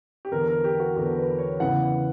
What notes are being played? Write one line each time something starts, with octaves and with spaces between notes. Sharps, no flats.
G4
E2 D3 A#4
A#4
G4
F#4
E2 D3 F#4
B4
C#5
E2 C#3 E3 F#5